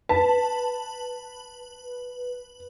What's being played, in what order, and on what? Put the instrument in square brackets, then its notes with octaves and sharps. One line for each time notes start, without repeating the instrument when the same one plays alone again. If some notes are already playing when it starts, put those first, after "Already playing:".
[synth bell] B4 [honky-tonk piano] A5